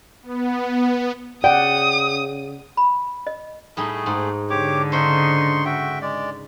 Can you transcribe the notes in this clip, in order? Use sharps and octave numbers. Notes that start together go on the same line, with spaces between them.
B3
C#3 D5 F#5 G5 D#6
B5
D#5
A2 G3 A3 D#4 G#4
G#2
D3 G4 C#5 D6
C#3 D#4 C5 C6 C#6
F#4 E5 G5
G#3 D5